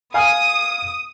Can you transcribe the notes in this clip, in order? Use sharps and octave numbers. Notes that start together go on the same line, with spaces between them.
F5 G#5 D#6 F6